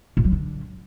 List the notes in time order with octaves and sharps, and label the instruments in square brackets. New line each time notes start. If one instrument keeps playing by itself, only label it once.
[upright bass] A#2
F#3
D3